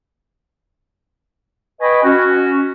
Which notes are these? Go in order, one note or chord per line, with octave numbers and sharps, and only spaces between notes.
B4 D#5 G5 G#5 B5 C#6
C#4 F#4